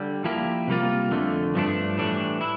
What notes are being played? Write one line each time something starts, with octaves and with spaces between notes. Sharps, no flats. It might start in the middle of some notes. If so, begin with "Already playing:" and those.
Already playing: D3 G3
F3 A#3 E4 G4
C3 G3 A#3 F4
F2 D3 A3
G2 F3 A3 D4
A2 E3 G3 D4
E4